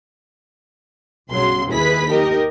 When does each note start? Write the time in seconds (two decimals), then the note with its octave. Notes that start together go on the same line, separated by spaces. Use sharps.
1.30 B1 G2 C#3 F#3 C6
1.70 D#2 E4 G#4 B4 B5 B6
2.09 D#4 G4 A#4 D#5